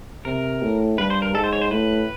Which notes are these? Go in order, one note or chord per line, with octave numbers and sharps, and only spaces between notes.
C3 A#4
A2
G2 B4
C5
A#4
G#2 A4
C5
C#5
C5
A2 B4